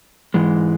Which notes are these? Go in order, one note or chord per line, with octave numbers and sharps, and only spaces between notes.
G#2 E3 G#3